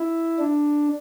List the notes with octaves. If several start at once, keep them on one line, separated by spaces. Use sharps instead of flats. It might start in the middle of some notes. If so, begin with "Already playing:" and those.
Already playing: E4
D4